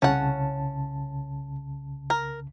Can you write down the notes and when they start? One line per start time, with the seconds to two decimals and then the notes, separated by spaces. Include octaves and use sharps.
0.02 C2 C#3 C#4 F#5 A5
2.10 A#4